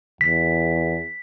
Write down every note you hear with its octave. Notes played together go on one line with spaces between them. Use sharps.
E2 B6